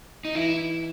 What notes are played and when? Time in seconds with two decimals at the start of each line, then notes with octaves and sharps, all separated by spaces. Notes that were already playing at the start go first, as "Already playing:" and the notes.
0.25 D#4
0.34 E3 E4